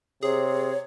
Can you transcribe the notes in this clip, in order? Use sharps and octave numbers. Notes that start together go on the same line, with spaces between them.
C3 G#4 C#5